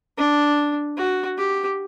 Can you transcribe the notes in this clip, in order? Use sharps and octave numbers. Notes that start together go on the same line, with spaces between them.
D4
F#4
G4